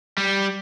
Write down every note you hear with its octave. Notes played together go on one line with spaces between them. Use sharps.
G3